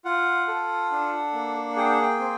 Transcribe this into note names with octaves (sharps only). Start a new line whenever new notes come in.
F4 F#5
A4
D4
A#3
G#4 G5
F#5
G5
C4